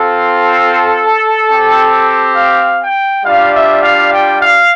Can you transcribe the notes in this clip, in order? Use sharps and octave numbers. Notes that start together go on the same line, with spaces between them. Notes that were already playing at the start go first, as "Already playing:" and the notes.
Already playing: C4 F4 A4
C4 G4
F5
G5
G3 D4 F4 F5
E5
F5
G5
F5